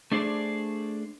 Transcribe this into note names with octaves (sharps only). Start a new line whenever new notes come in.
A3 D4 G#4 C5 D5